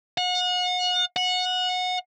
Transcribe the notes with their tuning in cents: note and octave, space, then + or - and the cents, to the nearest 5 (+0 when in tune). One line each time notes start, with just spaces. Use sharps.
F#5 -35
F#5 -20